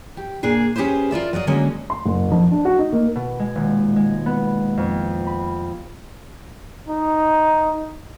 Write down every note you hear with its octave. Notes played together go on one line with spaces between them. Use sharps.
G4
A#2 D4 G#4 G#5
C#4 G4 G#4 B4 C5
F4 A#4 D5 E5
F#3 A#4 D5 D#5
D3 F#3 G#3 A#3 C#4
C6
F#1
F2
D4
F#4
D#4
A#3
B2
G#3
D#1
G#3
B3
F2
B5
D#4